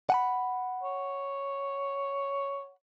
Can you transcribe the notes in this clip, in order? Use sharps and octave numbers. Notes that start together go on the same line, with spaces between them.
F#5 G#5 B5
C#5